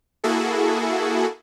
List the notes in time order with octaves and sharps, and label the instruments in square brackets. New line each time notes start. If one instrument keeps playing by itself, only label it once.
[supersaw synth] A#3 E4 F#4 G#4 A4